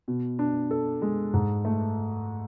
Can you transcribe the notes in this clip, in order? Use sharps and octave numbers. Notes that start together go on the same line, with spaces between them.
B2
D4
A4
G#3
G#2
A3